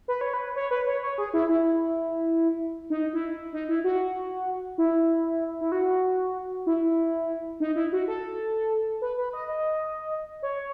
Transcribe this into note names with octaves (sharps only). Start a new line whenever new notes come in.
B4
C#5
B4
C#5
B4
C#5
C#5
G#4
E4
E4
D#4
E4
D#4
E4
F#4
E4
E4
F#4
E4
D#4
E4
F#4
A4
B4
B4
D#5
D#5
C#5